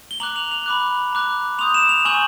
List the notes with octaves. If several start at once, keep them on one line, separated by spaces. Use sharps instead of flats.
G7
A#5 D6 F#6 F#7
F7
F7
B5 D6 F#6
A#5 D6 F#6
C6 D#6 G6 F7
E7
F7
G#5 C#6 E6 G6 F#7